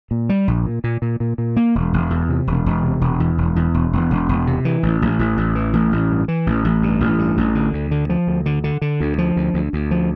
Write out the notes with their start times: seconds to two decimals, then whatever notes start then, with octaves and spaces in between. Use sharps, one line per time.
0.11 A#2
0.29 G3
0.48 A#1
0.66 A#2
0.84 A#2
1.02 A#2
1.20 A#2
1.38 A#2
1.56 A#3
1.75 E1
1.93 E1
2.10 E2
2.29 C3
2.47 E1
2.66 E1
2.83 C3
3.01 E1
3.20 E2
3.38 E1
3.56 E2
3.74 E1
3.93 E1
4.11 E1
4.29 E1
4.47 C3
4.65 E3
4.83 A1
5.02 A1
5.19 A1
5.37 A1
5.55 E3
5.73 A1
5.92 A1
6.10 G2
6.28 E3
6.47 A1
6.65 A1
6.83 G2
7.00 A1
7.19 G2
7.37 A1
7.55 D3
7.73 D2
7.91 D3
8.09 F3
8.27 D2
8.46 D3
8.64 D3
8.82 D3
9.00 D2
9.18 F3
9.36 D2
9.54 D2
9.73 D2
9.91 F3